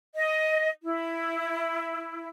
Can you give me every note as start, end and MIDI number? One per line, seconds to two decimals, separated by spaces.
0.15 0.70 75
0.83 2.28 64